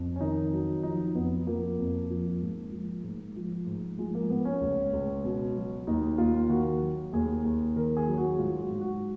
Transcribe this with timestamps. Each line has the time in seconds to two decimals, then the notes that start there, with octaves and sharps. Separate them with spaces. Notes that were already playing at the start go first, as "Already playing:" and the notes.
Already playing: F2
0.16 C#4
0.21 D#3 D#4
0.53 F#3
0.83 F3 D#4
1.15 F2 B3
1.47 F3 A#3
1.79 F2
2.10 F3
2.41 G#2
2.72 F3
3.04 G#2
3.36 F3
3.66 G#2
3.98 F3 G#3
4.15 A#3
4.30 G#2 B3
4.45 C#4
4.61 C#2
4.93 C#2
5.24 B2
5.56 F#3
5.87 D#2 D#4
6.18 D#2 F4
6.50 D#3 F#4
6.81 F#3
7.13 D#2 G#4
7.45 D#2
7.76 D#3 A#4
7.97 G#4
8.07 F#3
8.18 F#4
8.39 G#2 F4
8.60 F#4
8.70 G#2
8.81 F#4